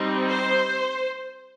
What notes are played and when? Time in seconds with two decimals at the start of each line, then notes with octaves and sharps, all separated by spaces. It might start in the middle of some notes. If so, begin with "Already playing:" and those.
Already playing: G3 C4 D#4
0.29 C5